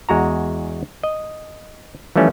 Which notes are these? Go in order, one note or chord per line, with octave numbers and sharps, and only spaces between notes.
E2 G#3 F#4 A#5
D#5
E3 F3 G3 A3 C#4